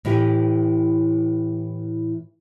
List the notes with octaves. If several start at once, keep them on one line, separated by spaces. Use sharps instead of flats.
A2 E3 E4 G4 B4